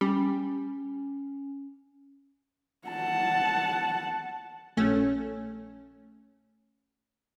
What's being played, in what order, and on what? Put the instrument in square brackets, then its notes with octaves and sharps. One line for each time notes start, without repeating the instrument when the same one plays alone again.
[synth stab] G3 [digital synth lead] C#4
[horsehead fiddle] F#5 A5
[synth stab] A#1 A3 C#4